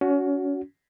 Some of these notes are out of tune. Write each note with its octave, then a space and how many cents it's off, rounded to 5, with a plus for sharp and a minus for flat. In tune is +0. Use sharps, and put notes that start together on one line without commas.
C#4 +30 F#4 +0